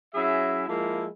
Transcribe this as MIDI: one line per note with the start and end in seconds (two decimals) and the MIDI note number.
0.14 0.67 54
0.14 0.67 61
0.14 0.67 64
0.14 0.67 68
0.14 0.67 76
0.68 1.06 53
0.68 1.06 56
0.68 1.06 58
0.68 1.06 64